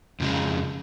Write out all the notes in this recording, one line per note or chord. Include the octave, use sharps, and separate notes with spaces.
F2 C#3 F3 G#3